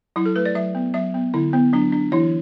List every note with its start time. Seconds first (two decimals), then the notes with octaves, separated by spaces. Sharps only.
0.16 F#3 E4
0.26 A4
0.36 A3 B4
0.45 D5
0.55 F#3 E5
0.75 B3
0.94 F#3 E5
1.14 B3
1.34 D3 E4
1.53 B3
1.73 F#3 D4
1.92 D4
2.12 E3 E4